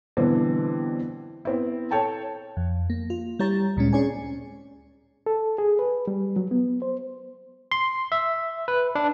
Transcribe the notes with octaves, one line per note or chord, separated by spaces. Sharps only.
B2 D3 E3 G3 B3 C4
B3 C4 E4
A4 C#5 G5 A5
F2
A#3
F4
G3 E4 G4 C#5 A#5 A6
D2 A#2 G#3 C#4
C4 C#4 G#4 C#5 D5 G#5
A4
G#4
B4
G3
F#3
B3
C5
C6
E5
B4
D4